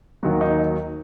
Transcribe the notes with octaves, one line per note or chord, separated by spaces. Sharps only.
D#2 D#3 F#3 F#4
D#4